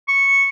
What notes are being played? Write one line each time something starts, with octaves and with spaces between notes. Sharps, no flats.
C#6